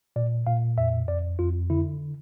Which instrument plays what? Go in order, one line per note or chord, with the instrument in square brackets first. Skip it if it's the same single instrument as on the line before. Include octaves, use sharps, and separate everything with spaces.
[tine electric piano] A#2 D5
A#2 F5
F2 E5
F2 D5
F2 F4
D3 E4